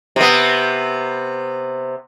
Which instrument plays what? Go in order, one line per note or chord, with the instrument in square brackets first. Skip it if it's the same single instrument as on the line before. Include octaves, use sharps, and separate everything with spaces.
[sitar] C3 B3